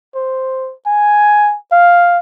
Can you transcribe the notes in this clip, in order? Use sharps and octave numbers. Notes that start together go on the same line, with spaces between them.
C5
G#5
F5